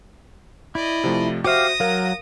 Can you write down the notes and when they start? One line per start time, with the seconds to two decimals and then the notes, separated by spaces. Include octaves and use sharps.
0.75 E4 D5 D#5
1.04 C3 F3 A3
1.44 F#4 G4 C5 E5 F5 D#6 A#6
1.80 F#3 A#4 F5